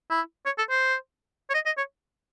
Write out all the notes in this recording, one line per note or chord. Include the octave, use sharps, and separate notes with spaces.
E4
C#5
A4
C5
C#5
D#5
D#5
C#5